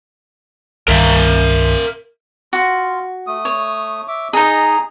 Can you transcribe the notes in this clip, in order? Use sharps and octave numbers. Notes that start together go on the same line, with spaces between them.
C2 G2 D#3 A#4 E5 F5
F4 F#4
A3 D#6
C#5
E5 D6
D#4 G#4 D#5 G#5 A#5